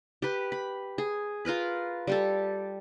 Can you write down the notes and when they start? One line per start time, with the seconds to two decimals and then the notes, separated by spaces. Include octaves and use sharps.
0.22 G4 B4
0.52 B5
0.98 G#4
1.45 F4 A#4 B4 B5
2.07 G3 G4 A4